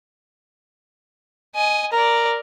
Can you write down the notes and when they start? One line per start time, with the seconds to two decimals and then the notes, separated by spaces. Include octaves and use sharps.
1.56 D#5 G#5
1.93 A#4 D5 A#5